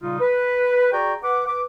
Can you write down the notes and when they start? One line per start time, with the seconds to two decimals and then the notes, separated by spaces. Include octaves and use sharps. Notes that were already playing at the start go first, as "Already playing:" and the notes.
0.01 A#2 C#3 G3 D#4 F4
0.20 B4
0.93 F#4 G#4 D5 G5 A#5 C#6
1.23 B4 F#5 D6
1.47 B4 D6